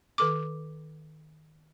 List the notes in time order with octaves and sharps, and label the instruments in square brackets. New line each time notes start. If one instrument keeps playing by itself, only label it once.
[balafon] D#3 A4 D6